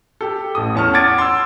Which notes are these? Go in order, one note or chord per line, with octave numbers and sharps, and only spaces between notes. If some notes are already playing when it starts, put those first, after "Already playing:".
G4 A4
A1 A4 D#6
E2 C#4 A5 C#6 F6
F#5 A5 D6 G#6 A6 D7
C6 E6